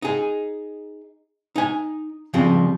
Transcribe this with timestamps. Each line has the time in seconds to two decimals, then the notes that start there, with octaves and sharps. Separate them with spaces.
0.02 D#4 G#4
1.56 D#4 G#5
2.34 C#3 F3 G3 C4